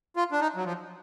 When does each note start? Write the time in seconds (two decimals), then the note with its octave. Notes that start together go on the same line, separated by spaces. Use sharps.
0.16 F4
0.32 D4
0.40 D#4
0.56 F#3
0.65 F3